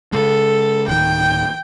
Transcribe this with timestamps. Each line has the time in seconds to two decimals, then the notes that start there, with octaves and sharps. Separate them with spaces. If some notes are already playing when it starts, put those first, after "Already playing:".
0.13 C#3 G#3 A4
0.88 D1 D#3 G5